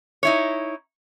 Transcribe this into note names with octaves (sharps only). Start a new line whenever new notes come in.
D#4 E4 C#5